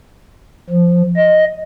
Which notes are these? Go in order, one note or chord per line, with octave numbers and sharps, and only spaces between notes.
F3
D#5